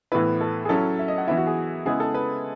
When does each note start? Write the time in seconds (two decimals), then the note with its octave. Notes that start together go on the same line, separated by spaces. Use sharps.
0.12 A2 E3 B3 E4 B4
0.41 A4
0.65 G#4
0.69 F#3 C#4 E4 A4
0.99 E5
1.08 D#5
1.18 F#5
1.28 E3 B3 E4 E5
1.37 F#4
1.47 G#4
1.85 C#3 G#3 B3 E4 G#4
2.00 A4
2.14 B4